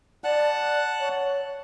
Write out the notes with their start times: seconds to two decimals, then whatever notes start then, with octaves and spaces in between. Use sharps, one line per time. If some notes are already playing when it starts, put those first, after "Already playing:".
0.24 D5 F#5 A5 F#6
1.00 C#5